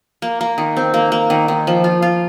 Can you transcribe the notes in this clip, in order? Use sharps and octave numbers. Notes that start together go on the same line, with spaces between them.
A#3
A#3
D#3
C4
A#3
A#3
D#3
D#3
F3
F4
F4